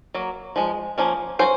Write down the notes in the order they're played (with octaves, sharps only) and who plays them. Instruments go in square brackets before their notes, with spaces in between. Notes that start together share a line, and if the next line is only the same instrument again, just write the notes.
[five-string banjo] F#3 A#3
F3 G#3
F3 A#3 C#4
F#3 C#4 C5